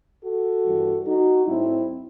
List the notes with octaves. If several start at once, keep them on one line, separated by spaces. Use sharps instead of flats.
F#4 A4
G2 E3 G3
D#4 F#4
A2 G3 C4 E4